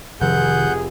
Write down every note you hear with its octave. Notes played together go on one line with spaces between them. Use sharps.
F1 C3 D#3 G#4 F#5 G6